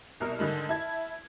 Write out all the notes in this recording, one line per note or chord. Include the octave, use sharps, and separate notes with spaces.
C2 B2 A#4 F6
G#2 D3 D#3 G#3
E4 A5 G#6